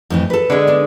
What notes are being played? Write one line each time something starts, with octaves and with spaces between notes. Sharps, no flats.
F2 A2 E3
A4 B4
D3 G#3
B3 D4